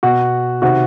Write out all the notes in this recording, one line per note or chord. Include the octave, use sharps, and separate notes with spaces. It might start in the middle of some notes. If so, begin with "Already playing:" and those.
B2 F#4 F#5
C3 D#3 F#4 F#5